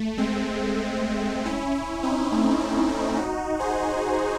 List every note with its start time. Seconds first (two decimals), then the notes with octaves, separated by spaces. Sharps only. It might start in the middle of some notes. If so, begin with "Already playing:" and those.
Already playing: A3
0.17 G#3 C4
1.45 C#4 E4
1.74 C#4 E4
2.03 C4 D#4
2.31 A3 C#4
2.59 A3 C#4
2.88 C4 D#4
3.16 D#4 F#4
3.59 G#4 C5